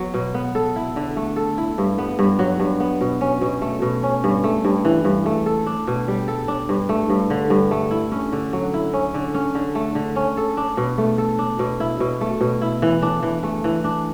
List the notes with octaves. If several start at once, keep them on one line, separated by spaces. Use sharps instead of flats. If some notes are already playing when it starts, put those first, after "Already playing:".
Already playing: F#3 B3
B2
B3
A4
E4
D3
A3
A4
E4
G2
B3
G2
F#3
G2
B3
B2
C#4
B2
A3
B2
C#4
G2
A3
G2
E3
G2
A3
A4
D4
B2
G3
A4
D4
G2
A3
G2
D3
G2
A3
E4
C#4
D3
F#3
E4
C#4
D3
C#4
D3
A3
D3
C#4
A4
D4
B2
A3
A4
D4
B2
E4
B2
A3
B2
E4
E3
D4
E3
A3
E3
D4